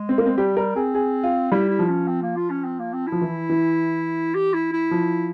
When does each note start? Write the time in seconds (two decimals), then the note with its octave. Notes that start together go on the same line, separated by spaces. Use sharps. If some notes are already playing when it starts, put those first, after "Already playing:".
Already playing: G#3
0.09 C4
0.18 A#3
0.26 C4
0.37 G3 G4
0.57 G3 A#4
0.76 C4 G#4
0.94 G#4
1.24 F4
1.52 G3 E4
1.70 E4
1.79 F3
1.89 C#4
2.07 C4
2.22 A#3
2.36 F4
2.50 C#4
2.65 C4
2.79 A#3
2.93 C4
3.07 F3 E4
3.21 E3
3.50 E3
4.35 G4
4.54 E4
4.73 E4
4.91 F3